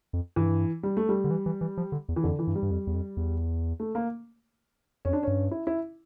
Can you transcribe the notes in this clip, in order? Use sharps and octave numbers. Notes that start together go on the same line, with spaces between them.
F2
G2 E3
G3
A3
G3
D3
E3
E3
E3
F3
D3
E2
E3
F2 D3
E3
G2
G3
G2
F2
E2
F2
E2
A3
A#3
F2 C#4
D4
G2 C#4
E4
E4